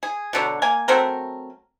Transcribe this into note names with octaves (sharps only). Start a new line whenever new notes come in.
G#4
B2 D3 F#3
A#3 G#5
F#3 A3 C4 A#4